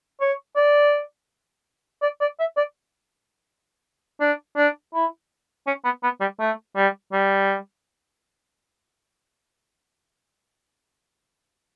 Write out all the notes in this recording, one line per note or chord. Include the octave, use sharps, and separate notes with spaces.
C#5
D5
D5
D5
E5
D5
D4
D4
E4
C#4
B3
B3
G3
A3
G3
G3